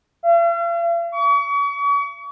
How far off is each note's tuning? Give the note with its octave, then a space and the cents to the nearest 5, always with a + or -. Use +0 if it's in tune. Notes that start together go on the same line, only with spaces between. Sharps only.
F5 -45
C#6 +40